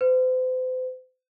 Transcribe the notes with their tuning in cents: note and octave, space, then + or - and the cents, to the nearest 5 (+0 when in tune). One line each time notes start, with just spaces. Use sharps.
C5 -40